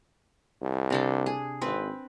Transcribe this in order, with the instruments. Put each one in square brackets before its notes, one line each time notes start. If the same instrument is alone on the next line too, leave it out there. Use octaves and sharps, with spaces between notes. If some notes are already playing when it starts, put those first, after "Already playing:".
[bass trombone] C2
[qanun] C3 D4 A4
G#4
[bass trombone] G#1 [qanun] C4 B4